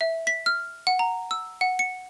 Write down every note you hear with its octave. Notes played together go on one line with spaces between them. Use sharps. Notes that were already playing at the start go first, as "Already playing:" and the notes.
E5
B6
F6
F#5
A#5
E6
F#5
C#7